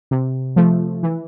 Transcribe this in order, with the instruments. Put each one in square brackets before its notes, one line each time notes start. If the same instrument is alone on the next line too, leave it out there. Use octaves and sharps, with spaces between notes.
[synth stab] C3
F3 A3
E3